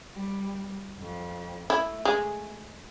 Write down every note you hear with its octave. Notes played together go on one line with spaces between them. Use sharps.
G3
F2
A3 E4
G#3